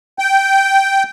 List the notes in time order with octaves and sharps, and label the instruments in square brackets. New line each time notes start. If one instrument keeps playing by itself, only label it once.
[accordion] G5